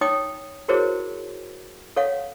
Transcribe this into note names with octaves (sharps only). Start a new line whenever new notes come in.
D#4 C#5 G5 D#6
E4 F#4 G#4 A#4 C5 C#5
A4 C#5 F5 F#5